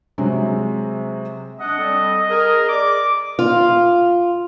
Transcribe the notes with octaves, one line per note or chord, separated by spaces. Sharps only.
C3 F#3 G#3
D4 D#5 F#5
G3 C4 A4
G#4 A#4
D5 D6
F4